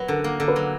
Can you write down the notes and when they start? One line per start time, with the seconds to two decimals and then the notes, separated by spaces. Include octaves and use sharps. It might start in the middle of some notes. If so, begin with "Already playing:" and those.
Already playing: F#3 B4
0.08 D3 A#4
0.24 A#3
0.40 D3
0.48 B4
0.56 F#3